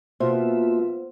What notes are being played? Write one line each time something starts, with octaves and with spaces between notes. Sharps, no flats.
B2 A#3 F4 C5 E5